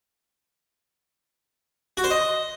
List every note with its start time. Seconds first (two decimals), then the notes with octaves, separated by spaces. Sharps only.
1.97 F#4
2.04 C5
2.10 D#5